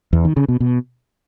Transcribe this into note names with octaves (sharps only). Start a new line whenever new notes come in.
E2
D#3
C#3
B2
B2